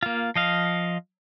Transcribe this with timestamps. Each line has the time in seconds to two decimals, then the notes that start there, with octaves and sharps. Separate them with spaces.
0.03 A#3 F4
0.36 F3 D#5 F5